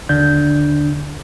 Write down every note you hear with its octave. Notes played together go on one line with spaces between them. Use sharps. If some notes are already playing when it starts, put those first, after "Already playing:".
D#2 D3 D4 G6